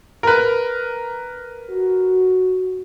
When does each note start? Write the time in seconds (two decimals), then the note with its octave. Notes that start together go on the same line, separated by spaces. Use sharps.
0.23 A#4 B4
1.70 F#4